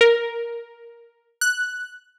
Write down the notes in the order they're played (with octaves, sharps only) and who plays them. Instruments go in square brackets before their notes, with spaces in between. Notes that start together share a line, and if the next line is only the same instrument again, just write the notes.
[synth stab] A#4
F#6